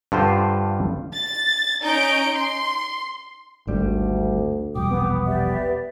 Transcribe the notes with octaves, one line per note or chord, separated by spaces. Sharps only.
G2 D3 F4 C5
A6
C#4 D#4 A#5 G6 D7
C6
G#1 D2 G3
E1 A#1 G3 G5 D6 D#6
B3
G4 D5 E5